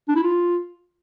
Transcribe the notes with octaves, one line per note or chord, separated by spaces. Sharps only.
D4
E4
F4